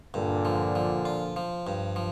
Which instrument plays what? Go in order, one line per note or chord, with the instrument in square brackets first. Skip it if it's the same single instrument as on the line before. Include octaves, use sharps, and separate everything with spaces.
[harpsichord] G2 [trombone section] A#2 D3
[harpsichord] F3
F3
F4
F3
G2
F3